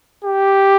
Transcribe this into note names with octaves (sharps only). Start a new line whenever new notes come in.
G4